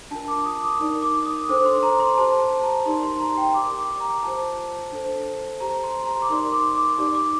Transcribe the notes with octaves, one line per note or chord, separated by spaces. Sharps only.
D4 F4 A#4 A5
D6
D#6
D6
D#4 A#4 D5
D6
D#6
D4 A4 C5 D6
C6
A#5
C6
G4 C5 A5
A5
A#5
D#4 G4 A#4 D5 C6
C6
A#5
G5
G4 A#4 D5 D6
D6
A#5
F4 C5 A5
D4 A4 C5
G4 C5 A#5
C6
A#5
D6
D#4 A#4 D5 C6
D6
D6
D#4 G4 D5 D6
D6